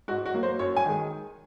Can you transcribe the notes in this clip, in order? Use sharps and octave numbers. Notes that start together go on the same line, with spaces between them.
G#2 F#4
F#4
F#3 A#3
C5
F#2 C#5
G#5
D#3 G#3